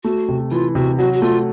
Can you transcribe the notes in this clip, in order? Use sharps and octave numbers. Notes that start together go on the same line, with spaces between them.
A3 F#4
C3
E3 F4
C3 F#4
F#3 F#4
F#4
A3 F4